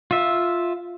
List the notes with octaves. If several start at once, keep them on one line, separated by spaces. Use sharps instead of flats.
F4 E5